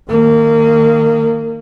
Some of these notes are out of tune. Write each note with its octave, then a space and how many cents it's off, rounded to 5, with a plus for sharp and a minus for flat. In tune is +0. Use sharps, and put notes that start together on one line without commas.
D#3 -10 A#3 -25